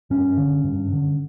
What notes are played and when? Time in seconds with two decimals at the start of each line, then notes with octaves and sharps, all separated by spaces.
0.10 G2 C#4
0.37 D3
0.64 G2
0.92 D3